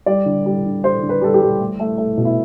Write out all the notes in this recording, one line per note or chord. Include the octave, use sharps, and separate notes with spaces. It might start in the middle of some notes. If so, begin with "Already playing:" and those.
G3 D5
D3
G3
D3
G3 C5
D3
B4
G3 A4
G4
G3
A3
A3
A3
B2
E4